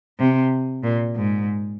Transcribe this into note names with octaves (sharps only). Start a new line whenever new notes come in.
C3
A#2
G#2